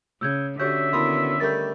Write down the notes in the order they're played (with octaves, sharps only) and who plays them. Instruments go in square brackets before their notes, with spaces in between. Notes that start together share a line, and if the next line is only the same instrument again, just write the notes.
[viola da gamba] C#3 [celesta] E6 G6 G#6
[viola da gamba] D3 C#4 [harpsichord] F#4 [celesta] G4 C#5 G6 [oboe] E5
[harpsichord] D#2 B2 D#5 [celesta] E4 B5 C6
[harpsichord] D#3 G3 A3 [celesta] G6 A6